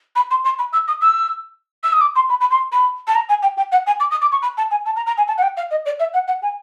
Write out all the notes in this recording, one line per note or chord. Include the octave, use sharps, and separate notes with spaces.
B5
C6
C6
B5
E6
D#6
E6
E6
D#6
D6
C6
B5
B5
C6
B5
A5
A#5
G#5
G5
G5
F#5
G#5
D6
D#6
D6
C#6
B5
A5
G#5
A5
A#5
A#5
G#5
A5
F#5
G5
F5
D#5
D5
E5
F#5
F#5
G#5